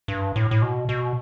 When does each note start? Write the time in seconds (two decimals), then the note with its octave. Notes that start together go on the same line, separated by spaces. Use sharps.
0.08 G2
0.36 A2
0.51 A2
0.62 B2
0.89 B2